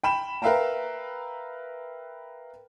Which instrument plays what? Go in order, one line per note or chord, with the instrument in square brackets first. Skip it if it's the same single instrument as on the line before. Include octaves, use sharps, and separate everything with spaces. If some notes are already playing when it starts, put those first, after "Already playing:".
[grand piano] G5 B5 E7
A#4 B4 E5 F5 G5 A#5